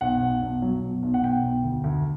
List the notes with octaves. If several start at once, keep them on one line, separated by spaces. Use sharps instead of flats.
B1 F#5
B1
B1
F#3
B2
B1
F#5
B2 G5
B1
D2
D2